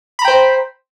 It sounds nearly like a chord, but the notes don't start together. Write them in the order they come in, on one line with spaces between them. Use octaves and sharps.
B5 A#5 G5 C5